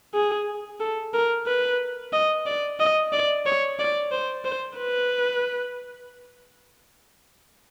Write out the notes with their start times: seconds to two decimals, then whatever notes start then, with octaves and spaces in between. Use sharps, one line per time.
0.14 G#4
0.80 A4
1.14 A#4
1.47 B4
2.13 D#5
2.46 D5
2.80 D#5
3.12 D5
3.46 C#5
3.79 D5
4.12 C5
4.45 C5
4.79 B4